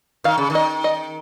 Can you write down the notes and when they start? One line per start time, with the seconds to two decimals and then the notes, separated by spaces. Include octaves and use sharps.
0.24 D#3 F5
0.38 C#3
0.50 D#3
0.55 D#5
0.84 D#5